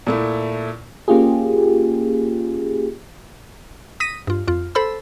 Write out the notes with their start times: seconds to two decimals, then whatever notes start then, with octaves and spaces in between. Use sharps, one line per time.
0.07 A#2 A3 E4
1.08 A#3 C#4 F4 G4 G#4
4.00 D#6 A#6 B6 D#7
4.27 G2 F4
4.48 F2 F4
4.75 A4 C5 B5 E6